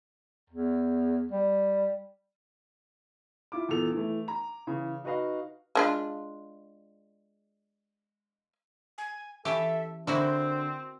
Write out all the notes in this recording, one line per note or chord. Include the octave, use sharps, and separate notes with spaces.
E2
G3
E4 F4 D6
E2 A#2 A4 F7
E3 A3
A#5
C#3 E3
D#4 F#4 B4 D#5 F5
G#3 D4 F4
G#5
E3 C#4 G4 A4 E5
D3 A#3 C4 E4 F#4 C5